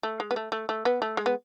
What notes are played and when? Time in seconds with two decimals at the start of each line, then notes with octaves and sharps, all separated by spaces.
0.03 A3
0.20 G#3
0.31 B3
0.36 A3
0.52 A3
0.69 A3
0.85 B3
1.02 A3
1.17 G#3
1.26 B3